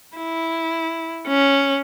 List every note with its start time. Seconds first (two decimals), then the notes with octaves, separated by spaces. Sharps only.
0.17 E4
1.28 C#4